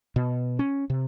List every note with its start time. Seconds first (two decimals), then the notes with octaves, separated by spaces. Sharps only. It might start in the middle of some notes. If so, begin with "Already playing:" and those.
0.16 B2
0.59 C#4
0.90 C3